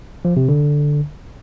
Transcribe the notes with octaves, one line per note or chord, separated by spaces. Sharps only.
F3
C3
D3